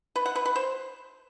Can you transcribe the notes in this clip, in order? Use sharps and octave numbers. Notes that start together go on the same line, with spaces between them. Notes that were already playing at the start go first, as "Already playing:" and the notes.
B4
F#5
B4
B4
C5